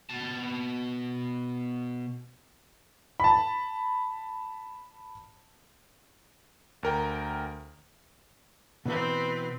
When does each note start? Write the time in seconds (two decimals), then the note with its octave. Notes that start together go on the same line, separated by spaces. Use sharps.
0.10 B2 A5
3.20 A5 B5
6.83 D2 A#4 G5
8.86 B2 E3 C4 B4